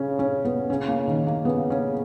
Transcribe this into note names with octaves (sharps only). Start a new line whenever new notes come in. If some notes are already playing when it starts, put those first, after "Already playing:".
Already playing: C#3 C#4
C#4
B3
C#3 C#4
A#3
D#3
A#3
C#3 B3
C#4